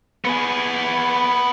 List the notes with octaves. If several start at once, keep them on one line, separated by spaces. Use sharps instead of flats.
B3 G#4